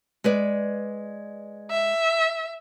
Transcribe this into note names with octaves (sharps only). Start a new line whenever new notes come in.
G#3 B4 D5
E5